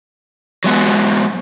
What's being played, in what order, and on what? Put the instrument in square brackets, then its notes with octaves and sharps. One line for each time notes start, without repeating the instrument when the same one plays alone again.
[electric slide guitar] F#3 G#3 B3